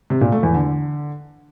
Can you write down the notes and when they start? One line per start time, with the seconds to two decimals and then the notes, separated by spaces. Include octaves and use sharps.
0.10 C3
0.21 A#2
0.32 A3
0.43 E2
0.54 D3